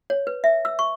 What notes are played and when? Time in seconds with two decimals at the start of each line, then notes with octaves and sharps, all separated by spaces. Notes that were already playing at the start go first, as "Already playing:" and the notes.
0.10 C#5
0.27 B4
0.44 E5
0.65 E6
0.79 C#6